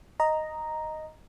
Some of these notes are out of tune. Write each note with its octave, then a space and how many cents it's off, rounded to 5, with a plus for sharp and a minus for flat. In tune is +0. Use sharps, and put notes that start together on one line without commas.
D#5 +0 A#5 +0